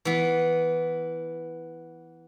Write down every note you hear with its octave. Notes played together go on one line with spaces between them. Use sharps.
E3 B3